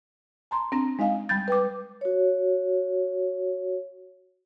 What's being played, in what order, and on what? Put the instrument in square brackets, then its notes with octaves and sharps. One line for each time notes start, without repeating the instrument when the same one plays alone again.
[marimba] A5 A#5 C6
C4 D4 A#5 A#6
G#3 D#4 D#5 F5 G#5
G3 B5 G6 A6
B4 G5 D6
[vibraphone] F#4 C#5